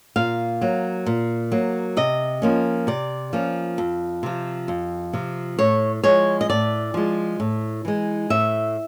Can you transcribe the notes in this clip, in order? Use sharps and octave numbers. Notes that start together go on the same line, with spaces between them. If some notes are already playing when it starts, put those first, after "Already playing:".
A#2 F5
F#3 A#3
A#2
F#3 A#3
C3 D#5
F3 A#3 C#4
C3 D5
F3 A#3 C#4
F2
C3 F3
F2
C3 F3
A2 C#5
F3 G#3 C#5
D#5
A2 D5
F3 G#3
A2
E3 G#3
A2 E5